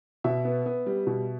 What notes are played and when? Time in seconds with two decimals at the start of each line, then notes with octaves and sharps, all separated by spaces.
0.24 B2 E5
0.45 B3
0.66 B3
0.86 G3
1.07 B2